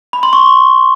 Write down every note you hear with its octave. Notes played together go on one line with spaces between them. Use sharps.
B5
C6
C#6